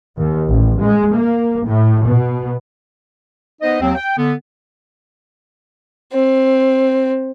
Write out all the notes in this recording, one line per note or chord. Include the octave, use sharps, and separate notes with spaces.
D#2
A1
G#3
A#3
A2
B2
B3 D#4 C5 D#5
D#2 F#3 C4
G5
D3 B3
C4